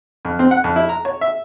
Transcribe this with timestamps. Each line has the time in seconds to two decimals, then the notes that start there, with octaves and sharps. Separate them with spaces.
0.25 F2
0.39 C4
0.51 F#5
0.64 F2
0.76 E4
0.89 A#5
1.05 C#5
1.21 E5